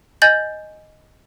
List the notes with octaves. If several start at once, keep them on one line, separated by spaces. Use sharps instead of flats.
D#5 G#5 G6 A6 F#7